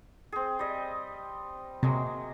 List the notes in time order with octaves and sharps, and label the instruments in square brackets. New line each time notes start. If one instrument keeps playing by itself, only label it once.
[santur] C4 G#4
G3 D#5
[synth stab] C3 [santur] F#3 G#3 A#3